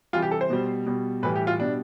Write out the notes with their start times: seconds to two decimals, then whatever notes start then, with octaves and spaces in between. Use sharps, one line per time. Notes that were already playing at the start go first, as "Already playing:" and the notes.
0.13 C3 E3 G3 F4
0.22 G4
0.31 A4
0.41 C5
0.50 B2 G3
0.86 B2 G3
1.23 A2 E3 G3 B4
1.36 G4
1.47 F4
1.60 B2 G3 D4